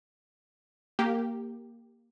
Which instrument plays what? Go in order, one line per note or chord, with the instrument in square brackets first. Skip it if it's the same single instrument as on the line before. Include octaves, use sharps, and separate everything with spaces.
[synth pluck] A#3 G4